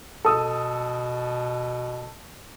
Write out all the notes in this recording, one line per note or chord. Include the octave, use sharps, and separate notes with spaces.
B2 A4 D#6 E6